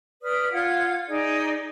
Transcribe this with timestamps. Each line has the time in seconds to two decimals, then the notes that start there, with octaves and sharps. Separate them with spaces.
0.23 B4 D5 D#6 F6
0.53 F4 F#5 F6 G#6
1.09 D#4 G#4 D5